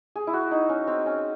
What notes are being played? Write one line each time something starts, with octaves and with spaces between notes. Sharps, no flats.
G#4
E4
F#4
D#4
C#4
C4
C#4